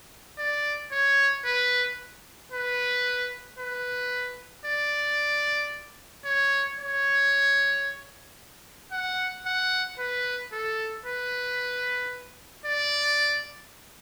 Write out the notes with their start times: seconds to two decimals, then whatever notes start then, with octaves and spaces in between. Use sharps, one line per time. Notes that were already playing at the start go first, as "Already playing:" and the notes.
0.38 D5
0.92 C#5
1.45 B4
2.52 B4
3.59 B4
4.65 D5
6.25 C#5
6.79 C#5
8.92 F#5
9.46 F#5
9.99 B4
10.52 A4
11.06 B4
12.65 D5